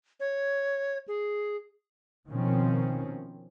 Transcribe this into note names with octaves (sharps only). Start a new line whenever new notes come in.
C#5
G#4
B2 D#3 F3 C4 C#4